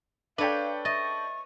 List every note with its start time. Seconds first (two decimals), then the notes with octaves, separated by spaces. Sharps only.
0.38 D4 A4 B4 C#5 F5 G5 D6 B6
0.85 D#5 E5 C#6 A6